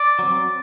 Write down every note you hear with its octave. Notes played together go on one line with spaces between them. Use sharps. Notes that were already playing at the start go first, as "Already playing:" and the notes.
Already playing: D5
F#3 C4